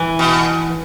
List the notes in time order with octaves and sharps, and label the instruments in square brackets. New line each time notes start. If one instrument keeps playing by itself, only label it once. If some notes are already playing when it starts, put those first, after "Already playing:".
Already playing: [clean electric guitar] E3
[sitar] B2